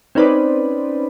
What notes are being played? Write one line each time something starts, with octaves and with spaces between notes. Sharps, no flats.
C4 C#4 D#4 B4 C5 D5